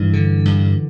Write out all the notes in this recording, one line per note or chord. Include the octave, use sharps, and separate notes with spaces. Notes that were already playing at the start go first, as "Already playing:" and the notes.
Already playing: G2 E3
D3
G2